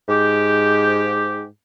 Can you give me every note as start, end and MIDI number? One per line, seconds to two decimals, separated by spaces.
0.09 1.45 44
0.09 1.45 67